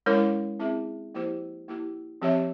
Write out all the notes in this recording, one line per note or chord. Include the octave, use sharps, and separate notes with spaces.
G#3 C#4 E4 A#4 C#5
C4 E4 G#4 E5
F3 A#3 E4 G4 C5
A#3 E4 G4
F3 C4 G4 C#5 E5